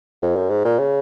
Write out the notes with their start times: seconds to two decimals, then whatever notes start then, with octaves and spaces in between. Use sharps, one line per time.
0.22 F2
0.36 F#2
0.50 G#2
0.65 A#2
0.79 C#3